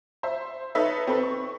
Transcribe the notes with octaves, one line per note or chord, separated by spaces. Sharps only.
C5 E5
D#4 A4 B4 C#5 E5
C4 A4 B4
C#6